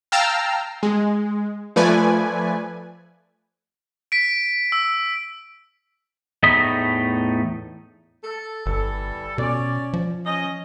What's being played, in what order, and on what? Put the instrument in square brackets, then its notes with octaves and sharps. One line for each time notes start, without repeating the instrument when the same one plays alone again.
[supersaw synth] F5 G5 A5 A#5 E6 F6
G#3
F3 A3 B4 D5 G#5
[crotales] B6 D7
E6
[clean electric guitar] E2 A2 A3 D#4 D#5 B5
[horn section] A4
[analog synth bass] G1 [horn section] E3 G3 A4
[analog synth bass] B2 [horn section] C#4 D5
[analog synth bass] F3
[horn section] C#4 D#5